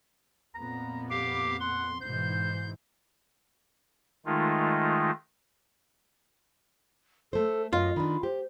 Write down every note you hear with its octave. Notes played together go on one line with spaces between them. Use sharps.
F2 A#2 B3 A#5
G4 F5 D6
F#5 C6
G#2 B2 E3 C5 G6
D#3 G#3 A3 D#4 F4
A3 A4 C5
F#2 F4 D#5
D#3 D4 B5
G4 C5